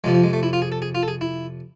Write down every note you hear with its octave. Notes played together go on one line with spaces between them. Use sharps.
F2 C3 F3 G#3
F3
G#3
A3
E4
F4
G#4
A4
G#4
F4
A4
G#4
E4